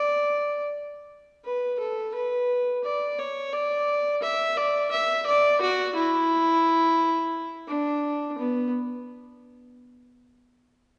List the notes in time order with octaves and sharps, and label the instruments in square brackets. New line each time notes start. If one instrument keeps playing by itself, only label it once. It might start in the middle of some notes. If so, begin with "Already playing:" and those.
Already playing: [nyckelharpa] D5
B4
A4
B4
D5
C#5
D5
E5
D5
E5
D5
F#4
E4
D4
B3